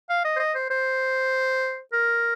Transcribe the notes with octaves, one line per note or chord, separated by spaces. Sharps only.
F5
D#5
C5
D#5
C5
C5
A#4